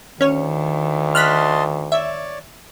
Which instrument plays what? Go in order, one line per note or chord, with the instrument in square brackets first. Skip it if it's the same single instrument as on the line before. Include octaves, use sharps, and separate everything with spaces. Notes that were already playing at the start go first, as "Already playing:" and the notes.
[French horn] D2 [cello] D#3 [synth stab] C#4 C#5
[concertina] D#5 A5 C6 [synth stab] F6 F#6 B6
[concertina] C#5 D5 [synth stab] E5